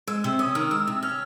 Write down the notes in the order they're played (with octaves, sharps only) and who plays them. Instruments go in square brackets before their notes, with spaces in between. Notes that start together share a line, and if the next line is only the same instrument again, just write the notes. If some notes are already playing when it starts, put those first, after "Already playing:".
[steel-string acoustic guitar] G#3 [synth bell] E6
[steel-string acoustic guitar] C3 [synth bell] E6
[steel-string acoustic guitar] C#4 [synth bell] D#6
[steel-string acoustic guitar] D#3 [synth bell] F6
[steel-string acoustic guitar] G#3 [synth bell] E6
[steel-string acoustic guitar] C3
[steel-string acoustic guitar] C#4 [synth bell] F6